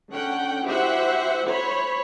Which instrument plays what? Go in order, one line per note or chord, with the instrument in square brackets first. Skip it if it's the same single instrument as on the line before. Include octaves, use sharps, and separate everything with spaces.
[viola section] D3 C#4 F#5 G5
E4 F#4 G4 C5 E5 F#5
C5 C#5 B5